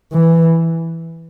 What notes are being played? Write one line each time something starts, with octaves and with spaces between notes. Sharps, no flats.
E3